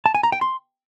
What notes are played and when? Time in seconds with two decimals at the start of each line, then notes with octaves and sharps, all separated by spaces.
0.06 A5
0.15 G#5
0.23 A#5
0.32 G5
0.41 C6